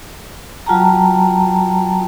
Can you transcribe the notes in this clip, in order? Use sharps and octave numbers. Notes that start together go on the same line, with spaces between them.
F#3 F4 F#4 G5 A5 A#5